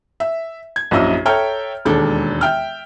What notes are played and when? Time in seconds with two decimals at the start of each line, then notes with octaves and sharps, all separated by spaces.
0.20 E5
0.76 G#6
0.91 A#1 F#2 E4 D#5 E6
1.26 A4 C#5 E5 G5 A#5 F6
1.85 E1 D#2 G#3 D4 A4
2.41 E5 G5 F6